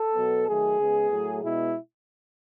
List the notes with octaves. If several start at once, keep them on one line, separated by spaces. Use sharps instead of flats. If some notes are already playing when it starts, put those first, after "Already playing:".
Already playing: A4
B2 F#3 B3
D#3 F#3 A3 G#4
C#3 G#3 B3
A2 F#3 A3
B2 G#3 B3 E4